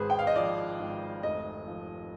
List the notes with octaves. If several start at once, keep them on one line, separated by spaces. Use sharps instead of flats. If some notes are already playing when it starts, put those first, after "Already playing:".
Already playing: G#1 G#2 G#4 B4 C5
G5
F5
D#5
F3 D5
G#1
F1 D#5
F3